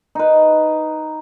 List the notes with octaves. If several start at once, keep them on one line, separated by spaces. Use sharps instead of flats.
D#4 B4